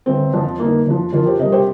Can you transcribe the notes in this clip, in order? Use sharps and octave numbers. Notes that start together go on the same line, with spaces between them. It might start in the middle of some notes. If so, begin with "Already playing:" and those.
G1 C4
F2 F3
G1 A#3 D#4
F2 F3
F2 F4 A#4
G4 C5
C3 G3 A#4 D#5
G4 C5